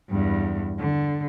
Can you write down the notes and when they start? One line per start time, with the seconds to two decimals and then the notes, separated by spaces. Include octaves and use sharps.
0.10 E2 G2
0.80 D3